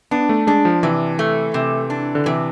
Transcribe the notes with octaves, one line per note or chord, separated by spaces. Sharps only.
B3 D4
A3
G#3 D4
F3
C3 E3
A3
C3
D4
D3
C3 E3